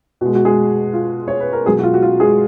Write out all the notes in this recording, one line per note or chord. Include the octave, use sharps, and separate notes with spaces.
B2 G#3 F#4
F#4
G#3 G#4
F4
C#5
B4
A#4
B2 F#3 G#3 G#4
F#4
F4
F#4
F4
G#3 G#4